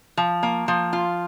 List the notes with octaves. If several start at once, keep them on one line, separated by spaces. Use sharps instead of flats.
F3
A#3
F3
F4